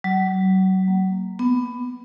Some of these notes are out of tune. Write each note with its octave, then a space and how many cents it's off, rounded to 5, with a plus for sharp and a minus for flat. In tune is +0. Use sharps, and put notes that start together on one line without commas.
F#3 +30
A#3 -10
B3 +10